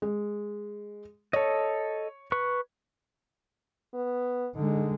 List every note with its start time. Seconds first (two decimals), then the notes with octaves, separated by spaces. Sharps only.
0.02 G#3
1.33 A4 C#5 D#5
2.32 B4 C#6
3.94 B3
4.55 D3 G#3 D#4